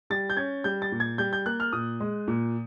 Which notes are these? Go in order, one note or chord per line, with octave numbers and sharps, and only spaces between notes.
G3 A6
G6
C#4 G#6
G3 G6
A6
A#2
G#6
G3 G6
G6
A#3 F#6
F6
A#2 D#6
G#3
A#2